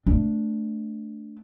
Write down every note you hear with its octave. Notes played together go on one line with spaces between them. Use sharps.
A3 D4